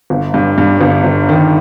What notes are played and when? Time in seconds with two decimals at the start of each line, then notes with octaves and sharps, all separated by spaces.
0.10 G1
0.34 G2
0.58 G2
0.81 G1
1.04 G1
1.29 D#3